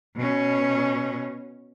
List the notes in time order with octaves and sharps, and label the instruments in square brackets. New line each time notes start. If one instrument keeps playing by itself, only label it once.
[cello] B2 C#4